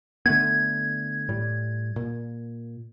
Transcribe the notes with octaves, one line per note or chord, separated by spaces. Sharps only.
D3 A3 B3 G#6
A2 G3
A#2